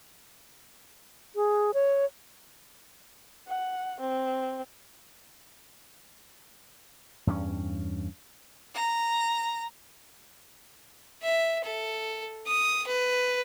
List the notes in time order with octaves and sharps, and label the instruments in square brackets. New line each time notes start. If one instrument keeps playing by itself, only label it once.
[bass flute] G#4
C#5
[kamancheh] F#5
C4
[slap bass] E2 G2 A#3 C#4
[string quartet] A#5
[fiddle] E5
A4
D#6
B4